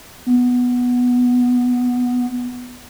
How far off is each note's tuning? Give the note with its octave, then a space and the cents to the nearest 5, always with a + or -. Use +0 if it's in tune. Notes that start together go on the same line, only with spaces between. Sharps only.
B3 -5